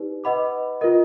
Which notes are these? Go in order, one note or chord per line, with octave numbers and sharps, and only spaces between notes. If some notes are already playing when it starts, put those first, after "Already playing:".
Already playing: D#4 G4 B4 D5
B4 D#5 F#5 B5 D6
F4 A#4 D#5